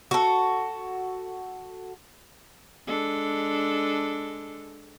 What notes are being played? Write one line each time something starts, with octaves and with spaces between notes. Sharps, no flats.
F#4 A4
G#3 D4 A4